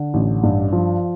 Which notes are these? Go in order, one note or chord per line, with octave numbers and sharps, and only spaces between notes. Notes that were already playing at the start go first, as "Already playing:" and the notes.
Already playing: D3
A1
G2
F3